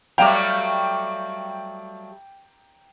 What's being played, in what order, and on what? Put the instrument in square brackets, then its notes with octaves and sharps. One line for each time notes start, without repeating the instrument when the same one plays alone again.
[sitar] F#3 G3 A3 [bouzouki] F5 [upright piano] G5 A#5 D6